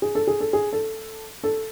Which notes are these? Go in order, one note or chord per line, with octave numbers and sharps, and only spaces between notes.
G#4
A4
G#4
A4
G#4
A4
A4